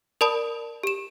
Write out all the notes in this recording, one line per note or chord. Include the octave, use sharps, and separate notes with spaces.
A#4 D5 A5 B5 D#6
G4 E7